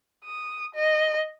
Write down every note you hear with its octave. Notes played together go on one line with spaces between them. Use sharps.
D#6
D#5